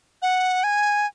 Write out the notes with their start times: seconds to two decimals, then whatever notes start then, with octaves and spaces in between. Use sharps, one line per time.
0.22 F#5
0.64 G#5